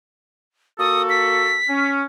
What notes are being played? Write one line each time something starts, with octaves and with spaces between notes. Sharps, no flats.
A#3 F#4 A4 D#6
B6
C#4